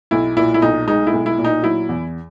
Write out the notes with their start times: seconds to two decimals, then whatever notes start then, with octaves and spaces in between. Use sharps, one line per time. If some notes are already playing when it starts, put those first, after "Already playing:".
0.11 B1 E4
0.37 A#2 E4
0.54 E4
0.62 B1 D#4
0.88 G#3 D#4
1.07 E4
1.13 B1
1.26 E4
1.38 A#2
1.44 D#4
1.63 F#3 E4
1.89 E2